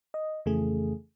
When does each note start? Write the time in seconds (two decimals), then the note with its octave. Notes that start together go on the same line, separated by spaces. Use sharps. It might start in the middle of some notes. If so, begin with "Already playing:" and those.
0.14 D#5
0.46 F2 C#3 E3 A3 G#4